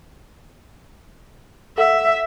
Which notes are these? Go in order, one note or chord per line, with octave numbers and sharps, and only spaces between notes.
A4 E5 F#5